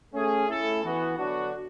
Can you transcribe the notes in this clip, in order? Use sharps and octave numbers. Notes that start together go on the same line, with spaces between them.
A3 C#4 G#4
A3 C#4 E4 A4
E3 B3 F#4
D3 F#3 B3 D4 F#4